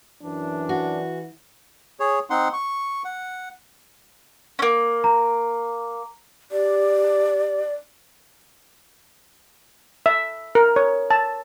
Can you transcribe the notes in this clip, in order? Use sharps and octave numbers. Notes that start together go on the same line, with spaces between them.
F#2 E3 D4
F#4
G#4 C#5
C4 D#4 F#5 C6
C#6
F#5
A#3 C#4
A#5
G4 D5
E5
A#4
C#5
A5